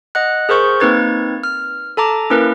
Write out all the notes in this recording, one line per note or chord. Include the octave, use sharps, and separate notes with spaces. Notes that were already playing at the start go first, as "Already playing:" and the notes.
D#5 F#5 F#6
G#4 A#4 C5 C#6 G6
A#3 C4 D#4 B4 G#6 A6
F6
A4 A5 A#5 D6
A#3 C#4 E4 A#4 B4